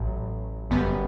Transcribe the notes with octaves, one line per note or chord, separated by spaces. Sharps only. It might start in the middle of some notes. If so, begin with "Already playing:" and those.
Already playing: A1 A2 F#3
G1 F#2 D3 G3 B3